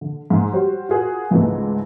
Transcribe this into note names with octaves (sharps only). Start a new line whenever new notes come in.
D3
G#2
G3 F#4 C5 C#5
F4 F#4 G#4 A#4
C#2 G#2 E3 G#3 A3 B3